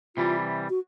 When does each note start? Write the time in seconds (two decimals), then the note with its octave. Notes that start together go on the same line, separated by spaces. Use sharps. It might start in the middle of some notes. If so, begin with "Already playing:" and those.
0.16 C3 E3 G3 F4
0.70 F#4